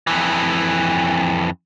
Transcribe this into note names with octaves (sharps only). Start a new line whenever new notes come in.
F2 E3